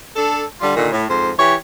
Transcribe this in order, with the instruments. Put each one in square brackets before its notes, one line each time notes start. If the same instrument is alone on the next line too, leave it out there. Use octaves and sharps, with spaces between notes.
[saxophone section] D4 A4
D3 G3 F4
A#2 D3 D#3
A2
F2 G#2 C5
E3 G4 C#5